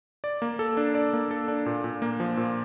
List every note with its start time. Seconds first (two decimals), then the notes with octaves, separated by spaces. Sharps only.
0.24 D5
0.42 A#3
0.59 A4
0.77 D4
0.95 D5
1.13 A#3
1.31 A4
1.48 D4
1.66 A#2
1.84 A#2
2.02 A#3
2.20 F3
2.37 A#2